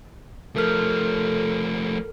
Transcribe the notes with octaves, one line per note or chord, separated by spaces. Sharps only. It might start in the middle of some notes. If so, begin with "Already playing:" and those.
F3 A3 A4 A#4 F6